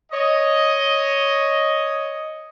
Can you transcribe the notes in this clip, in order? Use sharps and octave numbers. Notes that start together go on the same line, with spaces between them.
C#5 D#5